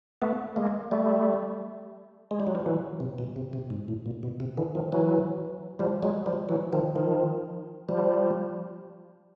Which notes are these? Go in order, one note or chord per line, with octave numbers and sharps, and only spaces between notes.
A3 B3
G#3 A#3
G3 A3
G#3
G3
F#3
F3 G3
E3 F#3
C3
B2
C3
C3
G#2
A2
A#2
B2
C3
D3 E3
D#3 F3
E3 F#3
F3 G3
F#3 G#3
F3 G3
E3 F#3
D#3 F3
D#3 F3
F3 G3